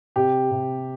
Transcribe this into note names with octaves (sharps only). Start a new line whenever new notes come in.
C3 G4
C3